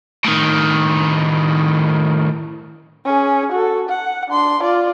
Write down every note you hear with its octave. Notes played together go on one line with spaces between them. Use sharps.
A2 D#3
C#4 G#4
F#4 A4
F#5
D4 C6
F4 D5